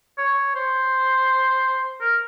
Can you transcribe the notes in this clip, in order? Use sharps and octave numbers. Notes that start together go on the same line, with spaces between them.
C#5
C5
A#4